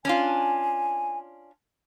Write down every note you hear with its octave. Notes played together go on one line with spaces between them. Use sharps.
C#4 D4 F4 G#5